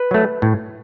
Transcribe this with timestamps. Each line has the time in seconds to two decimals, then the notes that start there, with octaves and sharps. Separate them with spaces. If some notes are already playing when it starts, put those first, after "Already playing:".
Already playing: B4
0.11 F#3 A3
0.42 A2